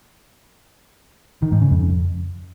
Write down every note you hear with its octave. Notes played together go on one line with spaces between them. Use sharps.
D#3
G#2
C#3
F2